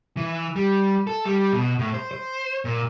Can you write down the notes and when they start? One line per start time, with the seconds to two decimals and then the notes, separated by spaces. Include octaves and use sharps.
0.17 E3
0.56 G3
1.07 A4
1.25 G3
1.53 B2
1.79 A2
1.94 C5
2.11 C5
2.65 A#2